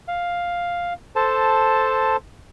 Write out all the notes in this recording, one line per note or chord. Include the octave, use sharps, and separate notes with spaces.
F5
A4 C5 A5